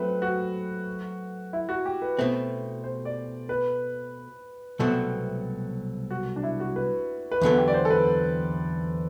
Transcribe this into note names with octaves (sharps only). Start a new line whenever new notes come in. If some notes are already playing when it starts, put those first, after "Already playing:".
Already playing: F#3 A3 C4 B4
F#4
E4
F#4
G4
B4
B2 A3 C4 C5
C5
D5
B4
C2 B2 F#3 A3 C4 A4
F#4
D4
E4
F#4
B4
B4
E2 D3 F#3 B3 A4
G4
D5
C5
A4
B4